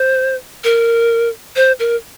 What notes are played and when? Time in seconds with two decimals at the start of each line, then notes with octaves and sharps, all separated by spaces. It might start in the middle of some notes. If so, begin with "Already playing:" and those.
Already playing: C5
0.64 A#4
1.56 C5
1.80 A#4